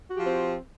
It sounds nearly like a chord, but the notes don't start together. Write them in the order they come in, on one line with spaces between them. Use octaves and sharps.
F#4 G4 F3 C4